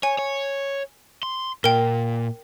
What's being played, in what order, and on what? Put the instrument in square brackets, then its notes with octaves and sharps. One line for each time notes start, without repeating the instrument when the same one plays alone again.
[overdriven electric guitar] C#5 [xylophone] G#5
[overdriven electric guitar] C#5
C6
[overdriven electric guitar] A#2 [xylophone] A#4 G5